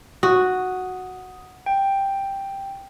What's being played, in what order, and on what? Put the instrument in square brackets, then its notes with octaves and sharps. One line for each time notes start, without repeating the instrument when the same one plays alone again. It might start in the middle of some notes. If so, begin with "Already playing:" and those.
[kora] F#4 [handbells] D#6
[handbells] G5